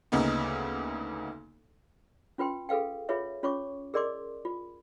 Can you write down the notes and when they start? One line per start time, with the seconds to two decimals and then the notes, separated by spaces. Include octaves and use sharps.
0.12 D2 C#3 A#3 B3 D#4
2.38 C#4 F4 B4 G5 C6
2.69 G#4 A4 B4 F5 G5
3.09 F4 G#4 B4 C#5 E5
3.43 C#4 F4 C#5 C#6 D6
3.94 G#4 A#4 D5 D#5 C6 D6
4.45 F4